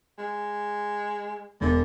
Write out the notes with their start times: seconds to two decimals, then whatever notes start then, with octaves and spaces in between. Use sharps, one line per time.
0.18 G#3
1.61 E1 D3